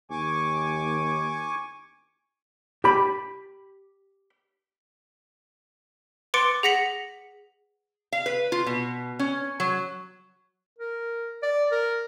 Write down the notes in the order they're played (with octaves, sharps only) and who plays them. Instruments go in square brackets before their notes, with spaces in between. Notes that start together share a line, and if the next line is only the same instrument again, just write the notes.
[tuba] D#2 [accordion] G#5 C#6 D6
[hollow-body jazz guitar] G4 B5
[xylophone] B4 C6 D6 A6 C#7 D7
G#4 F#5 A#6 B6 C#7 F#7
[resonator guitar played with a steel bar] F5
B4
F4
B2
C#4
F#3
[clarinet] A#4
D5
A#4